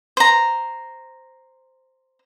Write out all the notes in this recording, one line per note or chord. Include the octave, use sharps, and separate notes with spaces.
C5 A#5